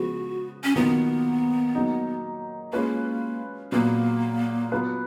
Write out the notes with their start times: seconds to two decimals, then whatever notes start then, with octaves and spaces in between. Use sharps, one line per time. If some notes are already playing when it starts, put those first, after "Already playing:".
Already playing: C#3 F3 G#3 B3 F#4
0.64 C#4
0.76 D#3 F#3 A#3 B3 F4 B4
1.75 F#3 A#3 D#4
2.73 G#3 A#3 C#4 F4 B4
3.72 A#2 F#3 A#3 B3
4.72 F#3 B3 F4 B4